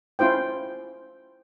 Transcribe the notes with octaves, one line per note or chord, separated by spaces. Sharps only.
C#4 E4 F4 C5 G5